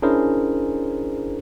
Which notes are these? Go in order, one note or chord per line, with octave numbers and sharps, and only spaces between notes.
C#4 D4 E4 G#4 A#4 C5